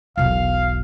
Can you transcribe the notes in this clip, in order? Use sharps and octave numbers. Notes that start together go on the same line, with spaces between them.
E1 B1 F5